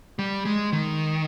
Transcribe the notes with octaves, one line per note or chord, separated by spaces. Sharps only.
G3
G#3
D#3